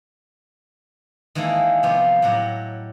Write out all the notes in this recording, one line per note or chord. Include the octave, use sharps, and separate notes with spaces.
D#3 E3 G#3 A#3 G#4 A4
C3 F3 B3 F4 G4
A2 F#3 G4 F#5 A#5